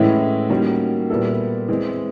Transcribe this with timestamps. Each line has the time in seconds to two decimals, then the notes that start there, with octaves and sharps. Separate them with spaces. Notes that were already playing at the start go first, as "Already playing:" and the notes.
Already playing: A2 E3 G#3 C#4 E4
0.50 D#3 G3 A#3 C#4 F#4
1.10 A#2 G3 B3 E4 A4
1.68 E3 G#3 C4